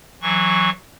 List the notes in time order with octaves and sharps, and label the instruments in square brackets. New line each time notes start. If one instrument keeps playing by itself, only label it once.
[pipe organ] E3 F#3 C#6